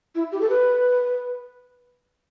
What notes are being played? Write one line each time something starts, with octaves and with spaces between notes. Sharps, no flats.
E4
G4
A4
B4